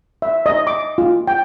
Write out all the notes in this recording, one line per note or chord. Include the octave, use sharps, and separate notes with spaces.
E5
D#5
D6
F4
G5